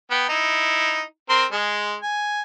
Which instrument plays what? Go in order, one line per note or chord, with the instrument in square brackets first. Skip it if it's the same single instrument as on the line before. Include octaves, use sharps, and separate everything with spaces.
[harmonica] B3 G5
D#4 E4
C4 A#4 C6
G#3 G#4
G#5